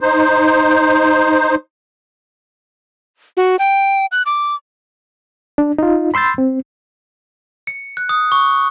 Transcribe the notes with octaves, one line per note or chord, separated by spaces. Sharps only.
D#4 C5
F#4
G5
F#6
D6
D4
D#4 F4
B5 C6 E6 G6 A6
C4
C#7
F#6
D#6
C#6